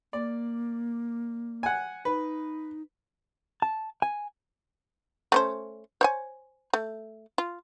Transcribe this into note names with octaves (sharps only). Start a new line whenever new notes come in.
A#3 D5
F#5 G#5
D#4 B4
A5
G#5
A3 C#4 C5
C5 C#5 G#5
A3
F4